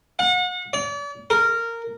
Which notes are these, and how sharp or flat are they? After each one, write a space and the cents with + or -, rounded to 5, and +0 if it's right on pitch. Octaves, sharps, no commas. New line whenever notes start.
F#5 -35
D5 -40
A#4 -15